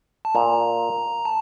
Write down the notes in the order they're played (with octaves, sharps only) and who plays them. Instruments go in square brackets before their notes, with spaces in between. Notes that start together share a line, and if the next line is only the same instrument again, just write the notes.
[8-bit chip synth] A5
[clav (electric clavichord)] A#2 [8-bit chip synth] A#5
[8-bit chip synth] A5